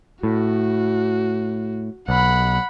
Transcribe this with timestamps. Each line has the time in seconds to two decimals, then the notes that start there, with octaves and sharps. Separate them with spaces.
0.23 A2 F#4
2.09 B1 F#5 B5